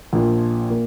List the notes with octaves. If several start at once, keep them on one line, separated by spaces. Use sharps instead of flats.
A#1 A#2 F3
A#2 A#3